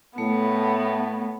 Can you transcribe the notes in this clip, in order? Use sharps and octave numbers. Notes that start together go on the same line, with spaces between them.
A2 A3 B3